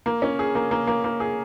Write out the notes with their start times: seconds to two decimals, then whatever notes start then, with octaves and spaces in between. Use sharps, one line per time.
0.06 A#3
0.22 C#4
0.39 G#4
0.55 A#3
0.71 A#3
0.87 A#3
1.04 A#3
1.20 G#4